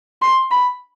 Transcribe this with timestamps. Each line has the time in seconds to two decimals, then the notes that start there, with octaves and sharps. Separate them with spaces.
0.22 C6
0.51 B5